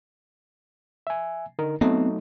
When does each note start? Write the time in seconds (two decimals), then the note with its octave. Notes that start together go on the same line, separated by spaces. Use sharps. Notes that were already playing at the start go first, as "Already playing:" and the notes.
1.07 E5 G#5
1.59 D3 D#4 A#4
1.81 F#3 A3 B3 C4 D#4